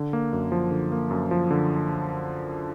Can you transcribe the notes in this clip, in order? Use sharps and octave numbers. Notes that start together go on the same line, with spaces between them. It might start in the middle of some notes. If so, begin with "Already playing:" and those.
Already playing: D3
A#3
F#2
F3
D3
A#3
F#2
F3
D3